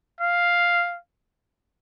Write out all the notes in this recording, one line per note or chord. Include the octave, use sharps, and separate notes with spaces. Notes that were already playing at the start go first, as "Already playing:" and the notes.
F5